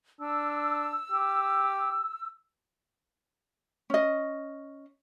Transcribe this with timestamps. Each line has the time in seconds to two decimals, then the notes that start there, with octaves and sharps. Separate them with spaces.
0.21 D4 E6
1.12 G4
3.90 C#4 D#5